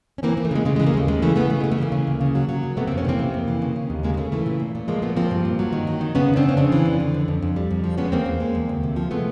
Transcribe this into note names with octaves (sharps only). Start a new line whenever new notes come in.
C#4
E3 A#3 C4
E3
A3
C#3 G#3
C#3 G#3
G#3
E3
G#3 A#3
D#2 A3
C#3 G#3
E3 A3
E3 A3 B3
C#3 A3
C#3 G#3
A3
E3 G#3 A#3
C#3
D2
C#3
F#3
F#3
C#3
C3 A3 B3
F2 A#3 C4
B3 C#4
E3 A#3 C4
C3
F2
E3
C#3
C#3
D#2
C#3 G#3 A#3
G#3
C#3 A3
E3 A3
A#2 A3
A#2
A#2
F3 G#3 A#3
A#2 A3 B3
F3 A#3 C4
G2
G2
F#3
D#3
F#3
D#3
C#3 B3 C#4
F2
C4 D4
F2
C#4
C#3 C4 D4
E3
F2
D3
F2
F2
F2
G3
F2
F3
G#3 B3 C#4
E2 A#3 C4
E2
G#3
E2
D2
C3
F3
G#3 A3 B3